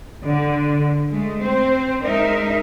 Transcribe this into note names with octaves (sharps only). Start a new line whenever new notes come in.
D3
G#3 A3
C4 C5
G#3 D#4 A#4 E5